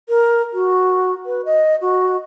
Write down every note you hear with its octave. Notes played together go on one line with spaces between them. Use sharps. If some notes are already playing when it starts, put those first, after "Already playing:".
A#4
F#4
B4
D#5
F#4